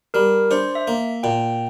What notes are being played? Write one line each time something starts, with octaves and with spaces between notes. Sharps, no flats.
G3 A#4
D4 C5
E5
A#3
A#2 G5